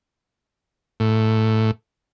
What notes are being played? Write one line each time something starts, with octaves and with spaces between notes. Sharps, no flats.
A2